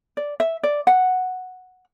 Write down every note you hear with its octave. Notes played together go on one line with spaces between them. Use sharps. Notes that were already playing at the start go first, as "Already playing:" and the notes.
D5
E5
D5
F#5